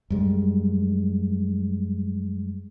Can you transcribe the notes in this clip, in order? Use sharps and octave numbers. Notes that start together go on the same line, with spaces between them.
F#2 G3 G#3